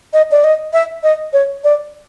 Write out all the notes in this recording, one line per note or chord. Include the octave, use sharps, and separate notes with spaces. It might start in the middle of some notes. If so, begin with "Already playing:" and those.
D#5
D5
D#5
E5
D#5
C#5
D5